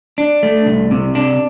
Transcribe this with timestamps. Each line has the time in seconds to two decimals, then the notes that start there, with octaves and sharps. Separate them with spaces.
0.18 D4
0.43 A3
0.66 C2
0.91 C3
1.15 D4